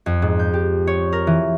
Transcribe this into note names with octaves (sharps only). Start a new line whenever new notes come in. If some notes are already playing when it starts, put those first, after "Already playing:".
F2
G#2
G6
G4
C#5
A#4
E3